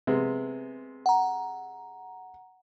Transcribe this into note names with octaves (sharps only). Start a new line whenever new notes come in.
C3 G#3 B3
F#5 A#5